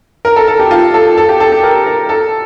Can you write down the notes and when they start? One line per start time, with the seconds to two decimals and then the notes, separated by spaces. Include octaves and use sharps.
0.25 A#4
0.36 A4
0.48 A4
0.59 G4
0.71 F4
0.94 A4
1.18 A4
1.29 G4
1.40 A4
1.52 G4
1.63 A#4
1.86 A#4
2.09 A4